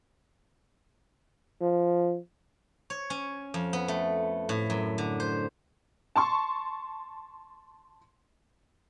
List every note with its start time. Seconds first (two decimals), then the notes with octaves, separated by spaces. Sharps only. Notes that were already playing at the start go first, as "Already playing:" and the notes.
1.61 F3
2.90 C#5
3.10 C#4
3.54 F2
3.73 B3
3.88 A3
4.49 A2
4.70 F#2
4.98 D3
5.20 C5
6.16 A5 C6 C#6